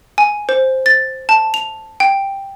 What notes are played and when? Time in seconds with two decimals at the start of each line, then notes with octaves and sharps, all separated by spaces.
0.18 G#5
0.49 C5
0.86 A6
1.29 A5
1.54 F7
2.00 G5